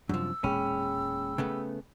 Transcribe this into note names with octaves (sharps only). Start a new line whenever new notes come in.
F#2 C3 F3 G3 D4 E6
E1 A#2 G#3 C#4 G#4 G5 B5
C#3 A3 B3